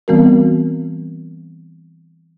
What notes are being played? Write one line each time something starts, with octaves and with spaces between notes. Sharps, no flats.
E3 G3 B3 C4 F#4 A#4